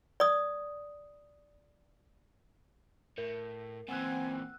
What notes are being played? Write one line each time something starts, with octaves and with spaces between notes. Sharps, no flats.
D5 D#6
A2 A#4
A#2 E3 C4 F#5 G#5 E6 F#6